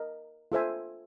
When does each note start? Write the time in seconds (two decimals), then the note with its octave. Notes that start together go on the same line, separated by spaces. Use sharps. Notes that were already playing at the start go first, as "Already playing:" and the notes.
Already playing: A#4 D#5
0.52 F4 A4 C5 E5 G#5